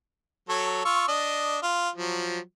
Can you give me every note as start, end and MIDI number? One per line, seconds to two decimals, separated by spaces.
0.49 0.85 54
0.49 0.85 69
0.49 0.85 73
0.85 1.07 65
0.85 1.07 85
0.85 1.07 88
1.08 1.58 62
1.08 1.58 75
1.62 1.89 65
1.96 2.39 53
1.96 2.39 54